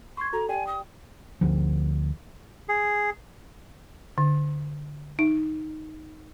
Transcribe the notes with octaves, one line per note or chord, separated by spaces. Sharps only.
C6 C#6 G#6
F#4 A4 A#5
G4 D5 G5 G#5
D#6
D2 F3
G#4
D3
D#4